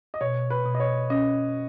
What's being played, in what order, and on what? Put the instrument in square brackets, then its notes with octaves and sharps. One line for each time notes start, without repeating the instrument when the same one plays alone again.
[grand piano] D#5
[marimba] B2 [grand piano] C#5
[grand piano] B4
[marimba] B2
[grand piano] D#5
C#5
[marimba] C#4 [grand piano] D#5